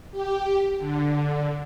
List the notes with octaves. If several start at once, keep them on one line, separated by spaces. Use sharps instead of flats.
G4
D3